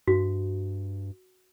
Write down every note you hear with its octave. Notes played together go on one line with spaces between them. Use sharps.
G2 F#4